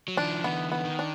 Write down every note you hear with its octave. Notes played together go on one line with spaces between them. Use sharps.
F#3
D#3 F3 D4
D3 E3 B3
B3
D#3
D4